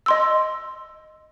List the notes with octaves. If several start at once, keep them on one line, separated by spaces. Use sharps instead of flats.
D#5 C6 E6